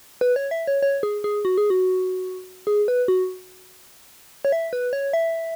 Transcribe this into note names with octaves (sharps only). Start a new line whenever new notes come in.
B4
C#5
E5
C#5
C#5
G#4
G#4
F#4
G#4
F#4
G#4
B4
F#4
C#5
E5
B4
C#5
E5